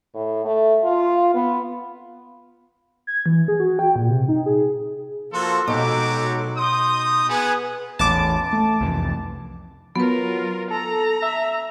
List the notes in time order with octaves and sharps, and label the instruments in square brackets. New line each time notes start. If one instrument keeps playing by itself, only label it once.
[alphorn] A2
A3
F4
B3
[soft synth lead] G#6
E3
G#4
F#4
G5
A#2
C3
D#4
G#4
[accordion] F3 A#3 [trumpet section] F#4 A4 [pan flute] C6
[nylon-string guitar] B2 [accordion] F#3 G#3 D#4 [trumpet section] F#4 G4 D6 [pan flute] A4
[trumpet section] D#4 D#6 [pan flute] C6 [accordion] G6
[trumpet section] B3 [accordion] G#4 G#5 [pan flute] B4
[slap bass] A1 E2 [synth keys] A5 D6
[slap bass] A3
C2 F2 E3
[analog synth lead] F#3 [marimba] B3 B4 [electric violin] F4 A#4
[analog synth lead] A4 [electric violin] A#5
[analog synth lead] E5